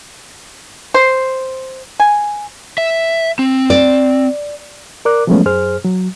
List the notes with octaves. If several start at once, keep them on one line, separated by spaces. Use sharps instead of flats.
C5
G#5
E5
C4
D5
A#4 D5 D6 F#6
F3 F#3 G#3 A3 B3 C#4
F#2 G#4 C5 F6
F#3